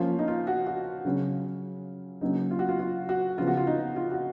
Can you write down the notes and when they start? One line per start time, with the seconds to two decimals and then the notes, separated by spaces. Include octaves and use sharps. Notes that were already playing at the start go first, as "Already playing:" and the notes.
Already playing: F3 A#3 C#4 F4
0.19 D#4
0.28 F4
0.47 F#4
0.67 F#4
1.05 C#3 F#3 C#4
2.21 C#3 F#3 A#3 C#4 D#4
2.51 F4
2.59 F#4
2.69 F4
2.79 F4
3.09 F#4
3.38 C#3 F3 B3 F4
3.47 F#4
3.57 F4
3.67 D#4
3.96 F4
4.11 F#4